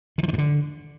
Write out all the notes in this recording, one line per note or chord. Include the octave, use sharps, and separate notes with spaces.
D#3
F3
D#3
G2
D3